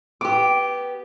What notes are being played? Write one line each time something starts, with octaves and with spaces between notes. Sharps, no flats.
B3 G4 D6